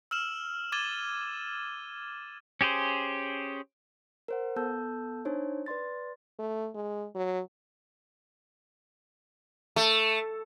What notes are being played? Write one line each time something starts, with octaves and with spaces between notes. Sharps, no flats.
E6 F6 E7 F#7
D6 G#6 A6 D#7 E7 G7
C#4 G4 G#4 C5
A#4 C5 F#5
B3 A4 A5 E6 G6
D4 D#4 C5 C#5
B4 D5 C6 A6
A3
G#3
F#3
A3